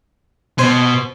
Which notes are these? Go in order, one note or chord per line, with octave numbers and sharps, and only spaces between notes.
B2 C5 G#5